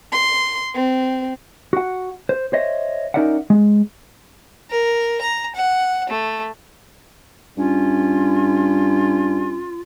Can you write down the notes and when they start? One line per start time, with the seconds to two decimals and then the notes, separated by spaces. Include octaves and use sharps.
0.12 C6
0.74 C4
1.73 F#4 F#5
2.29 C5
2.53 C5 C#5 D#5 E5
3.14 C#4 D#4 A#4 D5 E5 F#5
3.50 G#3
4.70 A#4
5.21 A#5
5.55 F#5
6.10 A3
7.57 G2 C#4 F4